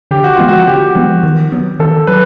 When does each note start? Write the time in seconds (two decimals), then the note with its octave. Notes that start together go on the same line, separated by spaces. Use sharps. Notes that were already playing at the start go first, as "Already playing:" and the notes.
0.11 D3 G4
0.24 F#4
0.36 F3 G#3 B3 F4
0.48 F#4
0.67 D3 G4
0.95 F3 G#3 B3
1.23 D#3
1.52 F#3 B3
1.80 D#3 A4
2.07 F#3 B4